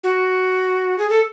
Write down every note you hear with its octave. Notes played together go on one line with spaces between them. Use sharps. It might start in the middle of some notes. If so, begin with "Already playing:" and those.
F#4
G#4
A4